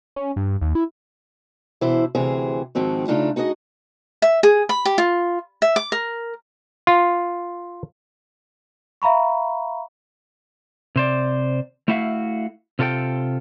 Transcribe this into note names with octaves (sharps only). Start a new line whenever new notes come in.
C#4
G2
D#2
E4
B2 E3 E4 C5
D2 C3 E3 G#4 C5
G#2 D#3 F3 C4 F#4
C#3 A3 D4 D#4 F4
D#4 F#4 G#4 C5 D#5
E5
G#4
B5
G4
F4
E5
D6
A#4
F4
E5 F5 A#5 B5 C#6
C3 C5 D5
A3 E4 F#4 E5 F5
C3 F4 A4 C#5 G5